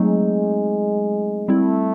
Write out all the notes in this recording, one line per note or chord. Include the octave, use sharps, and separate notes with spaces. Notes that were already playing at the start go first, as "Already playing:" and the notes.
Already playing: F#3 G#3 A3 C4 D#4
G3 A3 C4 E4